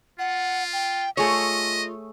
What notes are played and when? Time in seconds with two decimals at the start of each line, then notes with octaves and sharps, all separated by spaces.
0.19 F4 F#5
0.73 G5
1.17 A3 F4 G#4 C#5 D#5